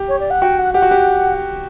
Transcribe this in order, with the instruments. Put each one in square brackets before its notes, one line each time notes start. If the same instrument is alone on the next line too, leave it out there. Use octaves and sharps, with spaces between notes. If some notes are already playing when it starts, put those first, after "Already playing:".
Already playing: [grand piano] G4
[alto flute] C#5
D5
F#5
[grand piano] F#4 [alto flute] G5
[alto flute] F#5
[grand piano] G4 [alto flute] F#5
[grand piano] F#4
G4